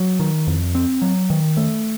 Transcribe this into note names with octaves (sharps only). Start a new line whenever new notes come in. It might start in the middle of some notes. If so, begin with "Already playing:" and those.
Already playing: F#3
D#3
F2
C4
F#3
D#3
A3